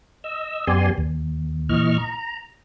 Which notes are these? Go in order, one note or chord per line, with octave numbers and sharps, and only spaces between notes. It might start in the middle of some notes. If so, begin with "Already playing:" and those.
D#5 E6
F#2 B3 G4 D5 G#5 C6
D#2
A#2 E3 D#5 C#6 F6
A#5